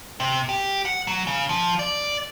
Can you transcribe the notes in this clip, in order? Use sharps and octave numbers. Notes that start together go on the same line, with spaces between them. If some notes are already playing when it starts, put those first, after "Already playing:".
C3
G4
F#5
F#3
C#3
F3
D5